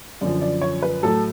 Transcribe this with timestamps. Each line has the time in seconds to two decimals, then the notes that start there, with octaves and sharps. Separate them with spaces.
0.21 F#2 D3 F3 D5
0.41 D5
0.62 C#5
0.82 B4
1.03 A2 F#3 A4